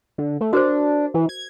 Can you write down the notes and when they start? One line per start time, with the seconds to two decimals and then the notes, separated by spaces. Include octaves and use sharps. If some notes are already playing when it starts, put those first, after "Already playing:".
0.18 D3
0.41 A3
0.53 D4 F#4 A#4 C5
1.14 E3
1.29 G#6